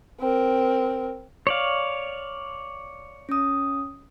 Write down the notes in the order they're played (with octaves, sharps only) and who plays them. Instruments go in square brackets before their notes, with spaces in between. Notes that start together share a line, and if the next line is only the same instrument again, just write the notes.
[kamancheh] C4 A#4
[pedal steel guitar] C#5 D5 F5
[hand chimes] C#4 D#6